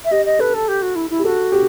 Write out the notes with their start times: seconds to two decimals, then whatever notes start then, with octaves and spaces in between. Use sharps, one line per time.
0.04 E5
0.11 G4 D#5
0.25 D#5
0.39 A4 B4
0.54 A4
0.68 G4
0.82 F#4
0.95 E4
1.10 E4
1.19 G4
1.24 F#4 A4
1.52 G4